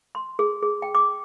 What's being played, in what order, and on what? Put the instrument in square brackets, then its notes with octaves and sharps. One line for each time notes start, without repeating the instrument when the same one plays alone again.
[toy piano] C6
G#4
G#4
G5
D6